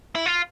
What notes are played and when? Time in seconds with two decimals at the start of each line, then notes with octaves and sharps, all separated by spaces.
0.15 E4
0.26 F4